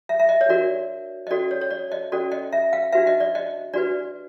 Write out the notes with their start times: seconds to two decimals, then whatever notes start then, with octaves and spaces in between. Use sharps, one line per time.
0.09 E5
0.20 E5
0.29 D#5
0.41 C#5
0.49 D4 F#4 A#4 D5
1.27 D#5
1.31 C#4 F#4 A4 D5
1.51 C#5
1.62 C#5
1.71 D5
1.92 D#5
2.12 C#4 F#4 A4 D5
2.32 D#5
2.53 E5
2.73 F5
2.93 D4 F#4 B4 E5
3.07 D#5
3.20 D5
3.35 D#5
3.74 D4 F#4 B4 D5